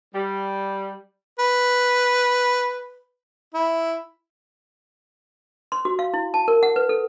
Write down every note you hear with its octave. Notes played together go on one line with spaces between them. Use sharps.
G3
B4
E4
C6
F#4
F5
E4
A5
A#4
F#5
B4
A4